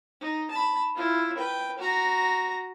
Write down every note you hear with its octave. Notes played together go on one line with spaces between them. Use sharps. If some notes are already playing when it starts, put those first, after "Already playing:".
D#4
A5 B5
E4 F4
B4 G5
F#4 A#5